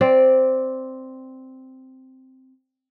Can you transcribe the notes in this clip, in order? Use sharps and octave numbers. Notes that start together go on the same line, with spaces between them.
C4 D5